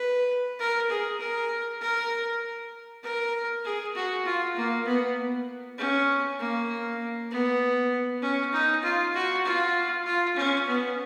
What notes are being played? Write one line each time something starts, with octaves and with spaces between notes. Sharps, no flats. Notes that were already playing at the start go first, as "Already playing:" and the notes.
Already playing: B4
A#4
G#4
A#4
A#4
A#4
G#4
F#4
F4
A#3
B3
C#4
A#3
B3
C#4
D#4
F4
F#4
F4
F4
C#4
B3